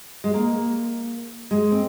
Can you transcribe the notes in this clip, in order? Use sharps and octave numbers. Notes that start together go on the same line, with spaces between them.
G#3
A#3
G#3
C4